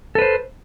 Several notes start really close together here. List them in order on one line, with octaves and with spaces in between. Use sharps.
A4 B4 C5